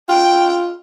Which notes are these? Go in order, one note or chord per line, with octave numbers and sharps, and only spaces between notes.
F4 G5